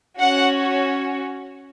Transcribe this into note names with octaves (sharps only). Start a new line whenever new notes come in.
C#4 F#4 F#5